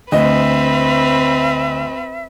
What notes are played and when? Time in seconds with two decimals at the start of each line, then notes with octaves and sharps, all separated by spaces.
0.12 D2 C4 B4 D#5 E5